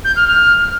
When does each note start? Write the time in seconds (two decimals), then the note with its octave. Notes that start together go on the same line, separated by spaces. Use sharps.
0.04 G6
0.16 F6
0.27 F6